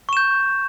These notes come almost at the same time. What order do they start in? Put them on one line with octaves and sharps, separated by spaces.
C#6 E7 G6